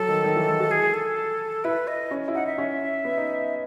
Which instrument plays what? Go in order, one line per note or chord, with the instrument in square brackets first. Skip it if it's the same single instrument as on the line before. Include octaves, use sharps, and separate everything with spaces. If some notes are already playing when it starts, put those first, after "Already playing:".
Already playing: [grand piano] F#3 [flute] A4
[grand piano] D#3
D#3
E3
G#3
F#4
[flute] G#4
A4
[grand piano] E4 [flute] B4
[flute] D#5
[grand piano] C#4
E4
[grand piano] D#4 [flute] F#5
[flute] E5
[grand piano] C#4
B3
D#4